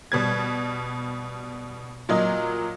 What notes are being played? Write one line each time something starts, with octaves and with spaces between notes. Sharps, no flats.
B2 G3 G#6
A#2 F#3 D#5